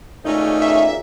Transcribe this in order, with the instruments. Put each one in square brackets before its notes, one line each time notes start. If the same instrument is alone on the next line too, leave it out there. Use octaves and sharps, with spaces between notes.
[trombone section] G#1 C#2 A#2 [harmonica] A3 C#4 [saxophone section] D#4
[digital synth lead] E5